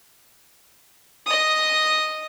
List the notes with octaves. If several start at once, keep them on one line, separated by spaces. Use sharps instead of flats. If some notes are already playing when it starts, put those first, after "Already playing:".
D#5 D#6